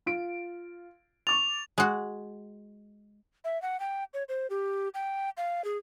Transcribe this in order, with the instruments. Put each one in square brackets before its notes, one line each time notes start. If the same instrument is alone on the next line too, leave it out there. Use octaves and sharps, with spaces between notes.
[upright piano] F4 D7
[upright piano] C#6 D6 A6 [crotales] F7
[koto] G#3 F#4
[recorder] E5
F#5
G5
C#5
C5
G4
G5
F5
G#4